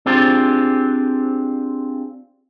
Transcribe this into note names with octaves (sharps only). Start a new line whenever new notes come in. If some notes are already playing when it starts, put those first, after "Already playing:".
C4 D4 F4 G4 G#4 C5